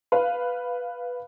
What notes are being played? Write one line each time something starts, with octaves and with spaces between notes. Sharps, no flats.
B4 F5